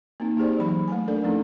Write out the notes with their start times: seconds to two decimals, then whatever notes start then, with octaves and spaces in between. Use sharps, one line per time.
0.20 A#3 C4 D#4
0.37 D#4 G4 G#4 C5 D5
0.59 E3 F#3 G5 B5
0.88 A3 G#5
1.08 D4 A4 A#4 D5
1.24 F3 A3 C4 C#4 D#4